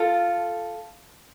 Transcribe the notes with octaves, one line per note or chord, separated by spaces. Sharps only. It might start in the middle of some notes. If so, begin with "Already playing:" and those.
Already playing: F4 A4